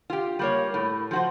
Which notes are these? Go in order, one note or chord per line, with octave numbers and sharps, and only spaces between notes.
F4 G4
G3 A#3 C#5
A2
F3 F#4 C5